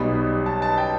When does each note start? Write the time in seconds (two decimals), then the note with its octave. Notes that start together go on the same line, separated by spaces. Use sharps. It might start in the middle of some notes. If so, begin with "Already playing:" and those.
Already playing: B1 B2 G3 B5
0.46 A5
0.62 A5
0.78 G5